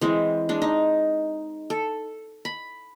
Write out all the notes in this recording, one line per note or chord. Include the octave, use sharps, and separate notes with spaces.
E3 G#3 C4
G#3 D4
D#4
A4
B5